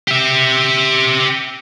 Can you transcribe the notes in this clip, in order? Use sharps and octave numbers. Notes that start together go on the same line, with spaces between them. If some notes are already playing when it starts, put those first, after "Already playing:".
G4 E5